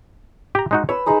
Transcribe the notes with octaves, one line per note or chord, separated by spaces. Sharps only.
G4 A#5
G#3 D#4 F#4
B4 C#5 E6
G#3 D#4 G#4